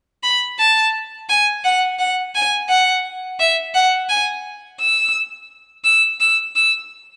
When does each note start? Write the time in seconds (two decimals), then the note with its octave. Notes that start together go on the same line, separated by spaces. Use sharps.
0.23 B5
0.59 A5
1.29 G#5
1.64 F#5
1.99 F#5
2.35 G#5
2.69 F#5
3.40 E5
3.75 F#5
4.09 G#5
4.80 E6
5.85 E6
6.20 E6
6.56 E6